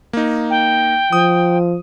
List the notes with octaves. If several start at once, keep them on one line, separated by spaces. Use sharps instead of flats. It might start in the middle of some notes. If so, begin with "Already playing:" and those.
A#3 D#4
G5
F3 D#6